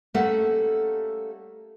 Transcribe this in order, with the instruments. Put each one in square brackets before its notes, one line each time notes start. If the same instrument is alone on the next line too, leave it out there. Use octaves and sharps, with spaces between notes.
[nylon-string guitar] G3 A3 A#3 C#4 A4 F#5